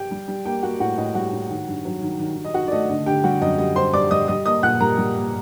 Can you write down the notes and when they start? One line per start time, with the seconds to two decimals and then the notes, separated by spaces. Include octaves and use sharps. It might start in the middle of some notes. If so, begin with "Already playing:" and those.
Already playing: G4 G5
0.11 G3
0.28 G3
0.45 A#3 G4 G5
0.63 A#3 F#4 F#5
0.80 A2 F#4 F#5
0.98 A2 D#5
1.15 G3 F#4 F#5
1.32 A2
1.50 D#3
1.68 G2
1.85 F#3
2.02 D#3
2.19 D#3
2.37 D#3
2.45 D#5
2.54 D#3 F#4 F#5
2.68 D5
2.72 A3 D#5
2.89 D3 D#5
3.06 D3 G4 G5
3.24 G3 F#4 F#5
3.41 F#2 D#5
3.58 G3 D#5
3.76 G3 C5 C6
3.93 G3 D5 D6
4.11 G3 D#5 D#6
4.28 G3 D#5 D#6
4.46 A#3 D#5 D#6
4.63 A#2 F#5 F#6
4.80 G3 A#4 A#5
4.98 G3
5.15 A#3